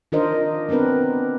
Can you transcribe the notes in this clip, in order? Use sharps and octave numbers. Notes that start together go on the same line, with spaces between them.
D#3 D4 F4 A#4 C5 D#5
B3 C4 D4 A#4 B4